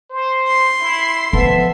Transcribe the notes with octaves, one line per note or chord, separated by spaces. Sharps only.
C5
C6
E4
F3 B3 A4 E5